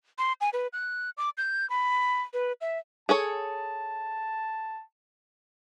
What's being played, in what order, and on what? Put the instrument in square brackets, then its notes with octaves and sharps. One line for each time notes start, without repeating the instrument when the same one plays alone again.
[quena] C6
G#5
B4
F#6
D6
G6
B5
B4
E5
[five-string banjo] G#4 A4 C#5 [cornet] A5